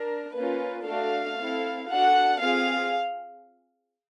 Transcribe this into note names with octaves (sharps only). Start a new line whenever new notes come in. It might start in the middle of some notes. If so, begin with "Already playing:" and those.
Already playing: D4 A#4
A#3 C#4 F4 B4
A3 D4 F#4 A4 F5
C4 E4 A4
D4 F#4 A4 F#5
C4 F4 G#4 F5